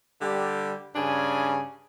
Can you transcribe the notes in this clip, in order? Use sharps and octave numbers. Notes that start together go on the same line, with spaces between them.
D3 G3 G4
G2 C#3 D4 G#5